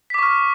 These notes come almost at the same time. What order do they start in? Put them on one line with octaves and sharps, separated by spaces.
B6 D6 C#6 F6